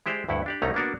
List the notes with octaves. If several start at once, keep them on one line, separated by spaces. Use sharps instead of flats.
G#3 E4 G4 C5 D5
D2 G2 E4 F#5 G5
D4 G4 D5
C2 A3 C#4 D#4 E4 A#5
A#3 B3 D4 F#4 A#4